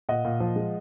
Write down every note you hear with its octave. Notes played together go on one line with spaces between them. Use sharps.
A#2 D#5 F#5
A#2
F3
G#3